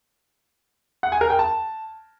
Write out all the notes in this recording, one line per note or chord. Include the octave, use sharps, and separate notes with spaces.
F#5
G#5
A#4
G5
A5